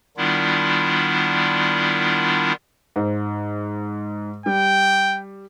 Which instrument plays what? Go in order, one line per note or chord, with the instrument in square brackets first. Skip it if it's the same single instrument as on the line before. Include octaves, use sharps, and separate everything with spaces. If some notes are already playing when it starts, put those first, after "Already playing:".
[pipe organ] D#3 G3 B3 D4 E4 F4
[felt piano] G#2 C5
[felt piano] G3 [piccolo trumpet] G5